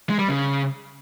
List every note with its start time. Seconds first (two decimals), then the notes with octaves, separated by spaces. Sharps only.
0.09 G#3
0.19 G3
0.29 C#3